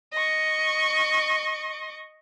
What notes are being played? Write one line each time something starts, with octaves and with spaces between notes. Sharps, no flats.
D#5 C#6